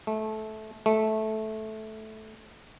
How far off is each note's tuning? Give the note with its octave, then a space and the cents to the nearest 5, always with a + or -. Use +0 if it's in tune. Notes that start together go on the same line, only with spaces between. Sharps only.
A3 -15
A3 -10